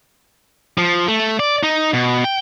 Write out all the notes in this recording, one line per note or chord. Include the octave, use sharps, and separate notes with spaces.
F3
A3
D5
D#4
B2
G5